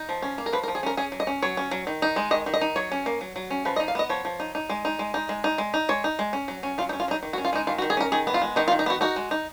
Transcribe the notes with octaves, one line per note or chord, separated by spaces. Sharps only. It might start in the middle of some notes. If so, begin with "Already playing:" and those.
Already playing: D#4
F3
C#4
A#3
A#4
F3 B4
A#4
F3
G#4
C#4 A#4
C#4 G#4
F#3
D#5
C#4
F#3 C#5
C#4
F#3
D#3
D#4
G#3
D#3 D#5
D#3
D#5
D#4
F#3 C#5
C#4
A#3
F#3
F#3
C#4
F3 B4
D#5
D#4
F5
B3 D#5
F3 C#5
F3
D#4
D#4
G#3
D#4
G#3
D#4
G#3
D#4
G#3
D#4
G#3 C#5
D#4
G#3
C#4
F#3
C#4
F#3 F4
D#4
C#4
F4
F#3 D#4
D#3
F#4
C#4
F4
G#3 D#4
D#3 F4
F#4
D#3
G#4
C#4 A#4
D#3 G#4
B3
F4
G#3
D#3 D#4
F4
D#3
D#4
B3 F#4
D#4 F#4
G#3
D#4